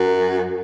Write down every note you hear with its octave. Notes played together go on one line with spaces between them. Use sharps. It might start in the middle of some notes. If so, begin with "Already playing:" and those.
Already playing: F#2